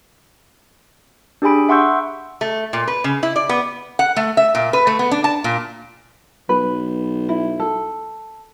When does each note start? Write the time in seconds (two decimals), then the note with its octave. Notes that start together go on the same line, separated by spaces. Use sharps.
1.42 D4 G4 G#4 G#5 B5 D7
1.69 E5 F#5 C6 C#6 E6 G6
2.41 A3
2.73 A#2
2.88 B4
3.04 C#3
3.23 E4
3.36 D5
3.49 B3
3.99 F#5
4.16 A3
4.37 E5
4.55 A#2
4.73 B4
4.87 A3
4.99 B3
5.11 D4
5.24 A5
5.44 A#2
6.49 B1 B4
7.29 E4
7.60 A4